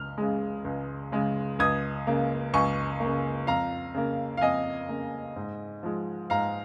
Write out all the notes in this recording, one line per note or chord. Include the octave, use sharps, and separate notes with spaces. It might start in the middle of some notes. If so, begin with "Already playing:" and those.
Already playing: C#2 F6
C#3 G#3
C#2
C#3 G#3
C#2 D#6 G#6
C#3 A#3
C#2 G#5 C#6
A#3
C#3
F2 F5 A#5
C#3 A#3
F5
F2 D#5 G#5
C#3 A#3
G#2
F3 G#3
G#2 F5 A#5